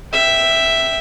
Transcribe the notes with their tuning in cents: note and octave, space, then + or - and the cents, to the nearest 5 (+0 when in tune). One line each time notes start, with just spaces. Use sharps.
E5 +0 G5 +0